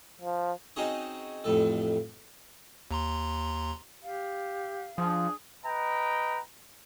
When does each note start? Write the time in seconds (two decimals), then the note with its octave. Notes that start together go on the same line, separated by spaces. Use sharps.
0.21 F3
0.76 C4 C#4 D#4 F#4 G#4 C#5
1.44 A1 F2 A2 A4
2.91 D#2 A#5 C6
4.03 G4 F5
4.98 F3 D4 G#4
5.65 B4 D#5 G5 A#5